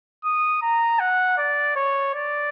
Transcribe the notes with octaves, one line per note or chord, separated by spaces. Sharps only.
D#6
A#5
F#5
D5
C#5
D5